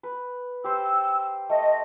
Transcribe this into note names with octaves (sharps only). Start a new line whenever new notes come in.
B4
G4 C5 E6
A3 D#5